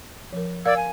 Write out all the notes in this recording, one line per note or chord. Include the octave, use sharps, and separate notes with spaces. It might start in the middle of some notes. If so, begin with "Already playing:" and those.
F3 A#4
A#4 D5 F5 E6 G#6
G#5